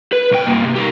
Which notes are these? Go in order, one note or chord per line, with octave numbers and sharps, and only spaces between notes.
B4
B1 G5
G2 A#3
C3
G4 A#4